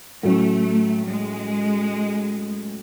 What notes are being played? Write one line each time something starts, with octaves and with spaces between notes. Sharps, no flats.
A2 F#3 A3 C#4
G#3